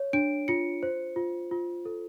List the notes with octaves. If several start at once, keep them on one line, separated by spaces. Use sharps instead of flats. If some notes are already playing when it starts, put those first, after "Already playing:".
Already playing: C#5
D4 D7
F4 C#7
C5
F4
F4
A4